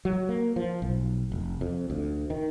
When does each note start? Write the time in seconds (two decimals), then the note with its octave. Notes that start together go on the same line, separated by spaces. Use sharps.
0.05 F#3
0.29 A#3
0.56 F3
0.82 B1
1.32 F1
1.61 F2
1.90 D2
2.30 D#3